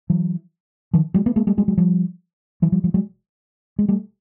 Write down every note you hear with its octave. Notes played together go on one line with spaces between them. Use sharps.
E3 F#3
D#3 F3
F#3 G#3
A3 B3
G#3 A#3
G3 A3
F#3 G#3
F#3 G#3
F3 G3
E3 F#3
F3 G3
F3 G3
F#3 G#3
G#3
G3 A3